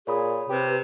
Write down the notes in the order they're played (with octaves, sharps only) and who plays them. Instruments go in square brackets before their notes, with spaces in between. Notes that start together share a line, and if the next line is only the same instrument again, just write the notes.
[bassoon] A#2 [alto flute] G#4 [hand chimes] C#5 B5 D#6
[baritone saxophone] C3 [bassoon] G4 [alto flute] B4